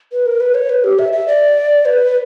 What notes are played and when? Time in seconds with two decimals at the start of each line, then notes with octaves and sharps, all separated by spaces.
0.12 B4
0.26 A#4
0.40 B4
0.55 C#5
0.69 B4
0.84 G4
0.99 E5
1.13 E5
1.27 D5
1.85 B4